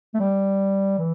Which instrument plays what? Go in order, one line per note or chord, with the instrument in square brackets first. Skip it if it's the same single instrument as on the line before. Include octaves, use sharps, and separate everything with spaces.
[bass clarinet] A3
G3
E3